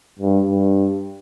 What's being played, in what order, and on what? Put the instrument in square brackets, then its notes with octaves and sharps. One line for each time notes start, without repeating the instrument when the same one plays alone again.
[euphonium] G2
G2